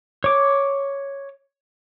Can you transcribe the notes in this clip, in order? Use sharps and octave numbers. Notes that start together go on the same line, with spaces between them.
C#5 D6